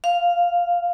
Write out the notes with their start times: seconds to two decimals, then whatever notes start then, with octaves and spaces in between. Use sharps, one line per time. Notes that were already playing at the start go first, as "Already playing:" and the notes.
0.04 F5